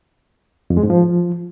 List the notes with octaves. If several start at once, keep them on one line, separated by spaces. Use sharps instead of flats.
F2
G#3
G#2
F3